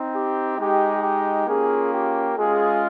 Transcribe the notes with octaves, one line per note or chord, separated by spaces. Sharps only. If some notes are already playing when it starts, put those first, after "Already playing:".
Already playing: C4 D#4
G4
G#3 D#4 G4
G4
A#3 C#4 F4 G#4
G4
G#3 C#4 F4 G#4